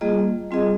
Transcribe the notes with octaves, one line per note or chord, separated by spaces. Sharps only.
G3 A#3 F4 G#4 D#5
G3 C4 F4 G#4 D#5